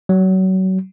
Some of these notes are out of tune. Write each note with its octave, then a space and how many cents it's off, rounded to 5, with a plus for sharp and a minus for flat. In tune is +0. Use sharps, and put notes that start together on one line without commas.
F#3 +25